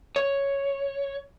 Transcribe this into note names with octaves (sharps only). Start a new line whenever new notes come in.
C#5